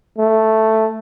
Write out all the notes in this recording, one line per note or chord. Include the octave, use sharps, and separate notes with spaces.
A3